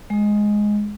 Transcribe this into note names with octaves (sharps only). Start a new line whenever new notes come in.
G#3